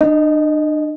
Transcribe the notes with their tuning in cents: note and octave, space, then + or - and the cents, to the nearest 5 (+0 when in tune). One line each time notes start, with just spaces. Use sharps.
D4 +40 D#5 +0